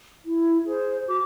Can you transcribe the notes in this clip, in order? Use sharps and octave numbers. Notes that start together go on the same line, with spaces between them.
E4
G#4 C5
F#4 D6